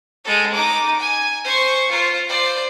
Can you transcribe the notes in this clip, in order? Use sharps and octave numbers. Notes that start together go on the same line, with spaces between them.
G#3 A4
D#4 D6
G#5
C5 C#6
F4 C5
C5 D5